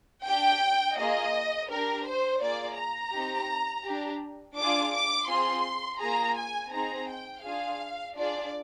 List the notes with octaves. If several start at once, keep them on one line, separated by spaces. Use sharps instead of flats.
D4 G4 G5
A#3 F4 G#4 D#5
D4 G4 A#4
C5
A#3 F4 G#4 D5
A#5
C4 D#4 G4
D4 G4
D4 F4 G#4 D6
D6
C4 F4 G#4 C6
A#3 F4 G#4 A#5
G#5
C4 D#4 G#4 A#5
G5
D4 F4 G#4 F5
D4 F4 G#4 D5